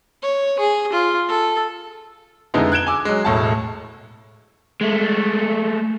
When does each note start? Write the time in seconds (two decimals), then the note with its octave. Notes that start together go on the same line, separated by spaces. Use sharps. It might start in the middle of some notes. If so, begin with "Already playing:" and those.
0.22 C#5
0.59 G#4
0.93 F4
1.29 A4
2.54 F2 D3 G#3 B3 D#4 E4
2.72 F#6 G#6 D7 E7 G7
2.87 G#5 D6 E6
3.05 F#3 G#3
3.25 E1 A2 A5
4.81 G#3 A3